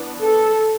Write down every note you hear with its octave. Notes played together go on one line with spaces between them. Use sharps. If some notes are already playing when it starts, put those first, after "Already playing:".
Already playing: E3 B3 D4
A4